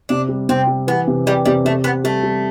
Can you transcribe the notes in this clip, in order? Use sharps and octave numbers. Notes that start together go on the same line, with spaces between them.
C3 D4
G3
C3 C4
G3
E3 B3
C3
E3 G3
C3 G3
C3 A3
B3 C4
G3 A3
G3